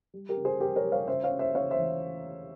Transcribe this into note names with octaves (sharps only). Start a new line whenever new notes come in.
G3
G4 A#4
C#3
G#4 C5
G3 G4 A#4
A#4 C#5
G3
C#5 F5
C#3 C5 E5
C#5 F5
C#3
C5 E5
C#3 C#5 F5
C5 E5
E3